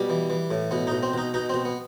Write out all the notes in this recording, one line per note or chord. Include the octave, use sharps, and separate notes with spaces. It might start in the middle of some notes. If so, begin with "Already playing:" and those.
Already playing: B2 G3
E3
E3
A2
B2 B3
B2 D#4
C4
B2 D#4
B2 D#4
B2 C4
B3